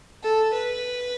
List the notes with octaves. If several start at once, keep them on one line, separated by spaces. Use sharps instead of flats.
A4
B4